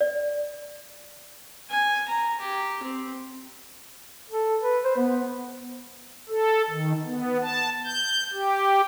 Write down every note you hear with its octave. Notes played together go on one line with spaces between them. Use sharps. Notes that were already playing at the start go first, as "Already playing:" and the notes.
D5
G#5
A#5
G4
C4
A4
B4
C5
B3
A4
D#3
B3
A5
G6
G4